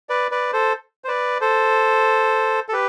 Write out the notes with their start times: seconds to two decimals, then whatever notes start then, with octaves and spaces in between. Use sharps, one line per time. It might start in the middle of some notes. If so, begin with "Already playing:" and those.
0.09 B4 D5
0.31 B4 D5
0.53 A4 C5
1.04 C5
1.08 B4 D5
1.41 A4 C5
2.69 A4
2.73 G4 B4